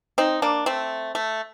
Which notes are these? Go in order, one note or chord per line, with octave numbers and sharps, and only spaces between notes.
C4 D#4
A#3 D4
A3 C4
A3